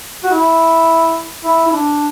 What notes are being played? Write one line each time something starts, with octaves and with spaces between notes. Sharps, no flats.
F#4
E4
E4
E4
D4